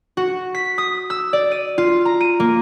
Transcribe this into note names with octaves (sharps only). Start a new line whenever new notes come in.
F#4
B6
D#6
E6
D5
D#7
F4
A#5
D#7
A#3